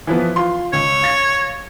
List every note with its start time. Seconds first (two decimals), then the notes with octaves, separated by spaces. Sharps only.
0.07 E3 F3 B3
0.36 F4 C6
0.73 C#2 C#5
1.02 F5 A6 A#6